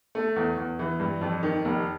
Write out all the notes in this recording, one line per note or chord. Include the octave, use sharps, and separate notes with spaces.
A3
E2
E2
E3
G2
F2
D#3
F1